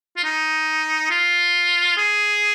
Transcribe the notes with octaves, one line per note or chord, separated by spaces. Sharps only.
F4
D#4
F4
G#4